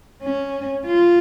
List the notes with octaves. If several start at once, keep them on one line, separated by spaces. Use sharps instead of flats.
C#4
F4